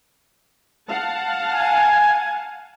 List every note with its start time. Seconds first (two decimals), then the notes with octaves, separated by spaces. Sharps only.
0.89 F5 F#5 A5
1.53 G#5